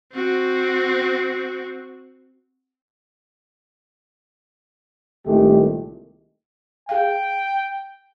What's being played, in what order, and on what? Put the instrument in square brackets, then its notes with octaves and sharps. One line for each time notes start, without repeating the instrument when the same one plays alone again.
[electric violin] C4 F#4
[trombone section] C2 A#2 D#3 G#3 A3 G4
[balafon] G#4 F5 [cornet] G5